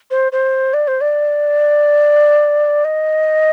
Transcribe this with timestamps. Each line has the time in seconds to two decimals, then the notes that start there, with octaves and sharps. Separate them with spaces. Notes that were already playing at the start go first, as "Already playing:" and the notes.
0.11 C5
0.32 C5
0.74 D5
0.88 C5
1.01 D5
2.85 D#5